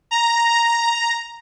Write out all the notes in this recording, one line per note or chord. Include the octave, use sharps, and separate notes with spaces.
A#5